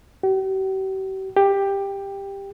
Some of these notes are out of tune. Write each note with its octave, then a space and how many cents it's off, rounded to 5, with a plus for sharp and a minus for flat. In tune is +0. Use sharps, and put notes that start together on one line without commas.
G4 -45
G4 +10